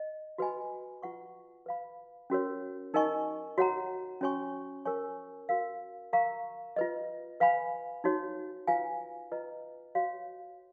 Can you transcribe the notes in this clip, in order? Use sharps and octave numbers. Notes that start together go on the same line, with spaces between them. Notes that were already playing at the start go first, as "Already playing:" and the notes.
Already playing: D#5
F#4 B4 D#5 G#5 B5
F4 B4 F#5 C#6
B4 F5 B5
C#4 F#4 A#4 C#5
D#4 A#4 D#5 G#5 C#6
F#4 C#5 F#5 A#5
C#4 F#4 C#5 G#5 C#6
A#4 C#5 G#5 C#6
F#4 A#4 F5
A#4 F5 A#5 C#6
F4 B4 D#5
B4 F5 G#5 B5
D#4 F#4 C#5
F4 B4 F5 G#5
F4 B4 D#5 A#5
F#4 C#5 F5